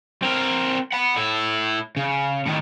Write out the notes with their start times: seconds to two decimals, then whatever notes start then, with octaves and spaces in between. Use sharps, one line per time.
0.22 C4 A#4
0.93 F#5 B5
1.16 A2 E4
1.97 C#3
2.46 A2 D#3